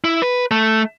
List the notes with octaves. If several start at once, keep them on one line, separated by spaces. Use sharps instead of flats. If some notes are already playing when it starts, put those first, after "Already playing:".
E4
B4
A3